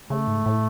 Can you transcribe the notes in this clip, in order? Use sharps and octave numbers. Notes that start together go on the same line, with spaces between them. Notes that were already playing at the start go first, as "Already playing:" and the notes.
C#3 A3
G#2
A2